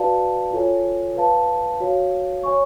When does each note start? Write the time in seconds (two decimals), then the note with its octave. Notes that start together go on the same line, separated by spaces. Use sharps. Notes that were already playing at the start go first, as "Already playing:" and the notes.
Already playing: F#4 B4 D5 F5 A5
0.53 F4 A4 C#5 G#5
1.16 B4 F5 A5
1.80 F#4 C#5 F5
2.43 C#5 G#5 C#6